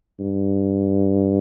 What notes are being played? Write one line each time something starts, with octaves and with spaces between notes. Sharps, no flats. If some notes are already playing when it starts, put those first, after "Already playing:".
G2